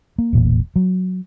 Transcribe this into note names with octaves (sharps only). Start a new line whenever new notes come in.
A#3
E1 A1 A#2
F#3